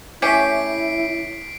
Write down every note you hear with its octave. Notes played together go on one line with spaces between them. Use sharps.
A3 C#4 E4 G4 B6 C7 D7